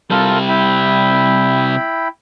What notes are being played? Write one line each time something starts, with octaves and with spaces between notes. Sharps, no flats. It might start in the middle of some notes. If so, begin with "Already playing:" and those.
C3 G3 F4 A4 A#4
E4 G5 B5